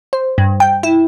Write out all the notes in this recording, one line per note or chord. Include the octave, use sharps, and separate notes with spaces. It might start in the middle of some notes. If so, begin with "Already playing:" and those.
C5
G2
G5
E4